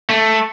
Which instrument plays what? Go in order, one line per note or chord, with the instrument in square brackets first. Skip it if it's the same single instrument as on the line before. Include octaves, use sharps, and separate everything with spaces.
[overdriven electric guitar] A3